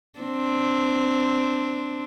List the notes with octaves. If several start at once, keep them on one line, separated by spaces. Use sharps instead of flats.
C4 D4